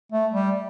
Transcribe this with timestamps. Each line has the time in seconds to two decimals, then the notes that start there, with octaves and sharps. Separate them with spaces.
0.12 A3
0.32 G3